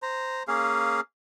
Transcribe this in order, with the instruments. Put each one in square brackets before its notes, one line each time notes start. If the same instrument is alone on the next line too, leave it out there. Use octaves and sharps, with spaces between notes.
[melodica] C5 A#5
A#3 C#4 G#4 F5